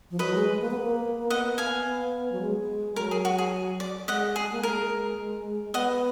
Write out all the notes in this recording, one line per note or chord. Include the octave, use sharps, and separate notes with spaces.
F3
F#3 B4 D#5
G#3
G#3
A#3
B3
A#3
B3 D#5 F#5
F5 G#5
B3
F#3
G#3
F#3 A#4
G#4
F#4
G#4
D5
G#3 D#5 F#5
G#4
A#3
G#3 A#4
B3 D#5 F#5